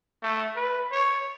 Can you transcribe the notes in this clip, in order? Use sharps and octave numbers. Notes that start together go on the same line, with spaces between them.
A3
B4
C#5